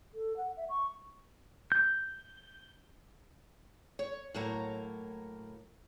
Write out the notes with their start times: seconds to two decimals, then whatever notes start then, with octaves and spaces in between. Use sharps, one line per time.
0.14 A4
0.37 F#5
0.57 E5
0.69 C#6
1.72 G6
3.99 C#5
4.34 A2 F#3 A#3 C#5 A#5